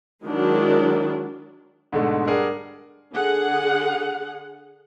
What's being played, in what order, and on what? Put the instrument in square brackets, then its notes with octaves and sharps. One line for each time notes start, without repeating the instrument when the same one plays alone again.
[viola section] D#3 F#3 G#3 D4 E4
[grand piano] G#2 B2 D3 G#3 A3
G3 D4 G#4 A#4 F#5
[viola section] D3 G#4 F#5